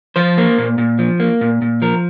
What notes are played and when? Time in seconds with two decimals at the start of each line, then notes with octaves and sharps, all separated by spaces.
0.16 F3 C5
0.38 A#3
0.58 A#2
0.78 A#2
0.99 F3
1.20 A#3
1.41 A#2
1.62 A#2
1.82 F3 A#4